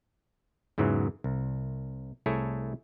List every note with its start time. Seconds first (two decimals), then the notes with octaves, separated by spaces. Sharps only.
0.78 E2 G#2 C#3 E3 F#3
1.24 C2
2.26 C2 A3 E4 G#4 A4 C#5